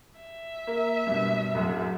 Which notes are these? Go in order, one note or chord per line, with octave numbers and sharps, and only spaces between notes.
E5
A#3
G2 B2
D1 F#2